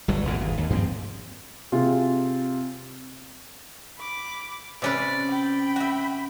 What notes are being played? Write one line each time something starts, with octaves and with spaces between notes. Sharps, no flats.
G1 G2 F#3
A1 E2 A2 C#3
G#1
D#2
G2 F3 B3 C4
C3 F4 G#4
B5 D6
C3 C#4 B4 D5
G5 B5
F#4 E5